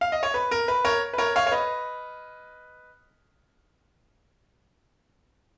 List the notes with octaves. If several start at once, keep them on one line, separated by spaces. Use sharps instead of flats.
F5
D#5
C#5
B4
A#4
B4
A#4 C#5
B4
A#4 C#5
C#5 F5
C#5
B4 D#5